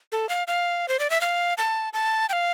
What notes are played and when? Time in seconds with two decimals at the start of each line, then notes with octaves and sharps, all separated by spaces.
0.12 A4
0.29 F5
0.47 F5
0.88 C5
0.99 D5
1.10 E5
1.21 F5
1.58 A5
1.93 A5
2.29 G5
2.33 F5